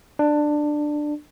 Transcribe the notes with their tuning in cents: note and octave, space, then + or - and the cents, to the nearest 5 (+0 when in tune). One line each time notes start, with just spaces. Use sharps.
D4 +15